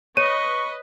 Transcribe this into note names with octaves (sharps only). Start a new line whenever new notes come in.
B4 C#5 D#5 C#6 D#7